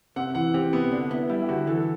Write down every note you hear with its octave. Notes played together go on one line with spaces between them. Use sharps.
C3 F#5
E3 F#5
C4 G4
C3 B3
D3 D4
B3 E4
G3 E4
G4
D3 F#4
E3 A4